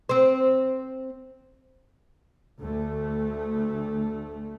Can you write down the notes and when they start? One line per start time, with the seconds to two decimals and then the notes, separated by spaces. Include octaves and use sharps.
0.09 C4 C5
2.60 D2 A3